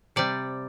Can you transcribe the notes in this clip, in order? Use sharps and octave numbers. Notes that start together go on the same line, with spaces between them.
C3 G3 D5